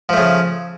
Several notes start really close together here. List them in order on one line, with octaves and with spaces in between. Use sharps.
F3 A3 C#3